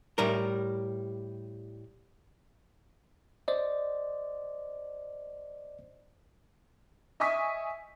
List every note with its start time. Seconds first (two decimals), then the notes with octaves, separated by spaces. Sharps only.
0.18 A2 G3 A#4
3.48 C5 D5 D#5
7.20 D#5 E5 G#5 C#6 D#6 B6